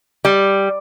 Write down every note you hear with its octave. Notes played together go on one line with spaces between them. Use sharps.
G3